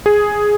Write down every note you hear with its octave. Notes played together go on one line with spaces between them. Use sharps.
G#4